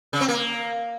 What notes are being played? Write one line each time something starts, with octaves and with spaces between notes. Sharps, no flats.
C#3
C4
A#3